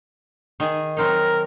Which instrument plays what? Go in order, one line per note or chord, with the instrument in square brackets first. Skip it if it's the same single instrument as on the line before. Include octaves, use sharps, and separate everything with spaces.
[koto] D#3 G#4
[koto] F#3 C4 D#4 [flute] A#4